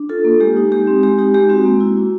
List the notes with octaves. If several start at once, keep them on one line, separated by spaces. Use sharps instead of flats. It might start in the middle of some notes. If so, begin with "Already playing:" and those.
Already playing: D4
F4 A4
A#3
G#3 G4
D#4
G#3 G4
C4
G#3 G4
D#4 G4
G#3 G4
C4 F#4
A#3
E4
A#3